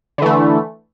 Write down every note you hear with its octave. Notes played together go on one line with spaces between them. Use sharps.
D3 E3 A3